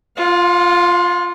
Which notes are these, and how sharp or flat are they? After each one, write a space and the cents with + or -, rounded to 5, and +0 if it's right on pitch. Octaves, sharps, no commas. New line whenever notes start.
F4 +0 F5 +45